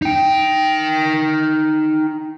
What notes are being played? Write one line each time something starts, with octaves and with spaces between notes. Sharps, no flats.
D#4 G5